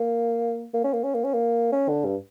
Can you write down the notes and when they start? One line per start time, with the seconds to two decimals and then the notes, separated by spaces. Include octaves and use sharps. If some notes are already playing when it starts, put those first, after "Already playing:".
Already playing: A#3
0.74 A#3
0.84 C#4
0.93 A#3
1.04 C#4
1.14 A#3
1.24 C#4
1.33 A#3
1.72 C#4
1.88 D3
2.05 G2